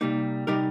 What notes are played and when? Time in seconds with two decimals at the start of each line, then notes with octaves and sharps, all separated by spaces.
0.01 C3 G3 A#3 D#4
0.47 C3 G3 D#4 G4 A#4